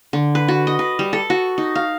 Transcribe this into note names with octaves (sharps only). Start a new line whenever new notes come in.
D3
B4
F#4
D#5
B4
G3
A4
F#4
D#4
F5